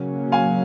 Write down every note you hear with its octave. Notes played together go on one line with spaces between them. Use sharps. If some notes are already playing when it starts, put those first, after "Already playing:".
Already playing: C#3 F#3 A#3 C#4
F5 G#5